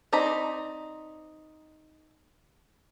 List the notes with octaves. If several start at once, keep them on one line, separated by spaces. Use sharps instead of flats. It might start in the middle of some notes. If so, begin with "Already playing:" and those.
C4 D#4 D5 A#5 B5